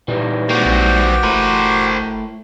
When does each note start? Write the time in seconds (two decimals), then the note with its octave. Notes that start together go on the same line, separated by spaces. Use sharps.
0.08 A#2 E3 G3 D#4
0.49 A#3 C4 F#4 G4 G5
0.65 A#1
1.23 F#1 A2 A#4 C5